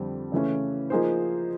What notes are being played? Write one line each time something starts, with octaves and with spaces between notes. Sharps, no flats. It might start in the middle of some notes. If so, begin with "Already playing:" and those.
Already playing: F2 D3 G3 C4
C#3 E3 A3 C#4
F3 A#3 D#4 G#4 C5